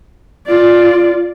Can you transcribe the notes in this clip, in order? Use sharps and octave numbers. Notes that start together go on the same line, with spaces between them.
F4 D5